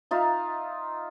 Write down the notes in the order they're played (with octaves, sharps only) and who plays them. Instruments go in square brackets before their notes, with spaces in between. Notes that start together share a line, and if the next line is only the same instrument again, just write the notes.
[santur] D#4 F4 E5 F5